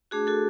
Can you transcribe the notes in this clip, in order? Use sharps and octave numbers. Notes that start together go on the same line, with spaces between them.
A3 D4 F#4 G#4
F#4 A4